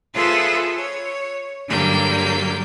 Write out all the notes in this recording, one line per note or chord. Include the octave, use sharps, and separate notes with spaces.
F4 G#4 A4 B4 C5 E5
C#5
G2 D3 F#3 G3 A#3 G6